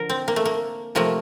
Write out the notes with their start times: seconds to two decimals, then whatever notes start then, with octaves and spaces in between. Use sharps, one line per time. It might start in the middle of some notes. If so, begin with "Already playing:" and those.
Already playing: D3 F3 A#4
0.10 C4
0.28 A#3
0.36 A3
0.46 A#3
0.95 C3 F3 A3 A#3